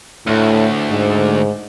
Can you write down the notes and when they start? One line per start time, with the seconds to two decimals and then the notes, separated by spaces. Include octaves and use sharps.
0.27 D2 A2
0.90 G#2